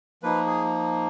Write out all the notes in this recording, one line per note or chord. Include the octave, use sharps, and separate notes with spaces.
F3 A#3 D#4 B4
G#4